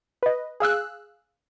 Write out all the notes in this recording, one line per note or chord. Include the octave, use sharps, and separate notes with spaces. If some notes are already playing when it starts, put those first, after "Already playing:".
B4 D#5
G#4 F5 E6 F#6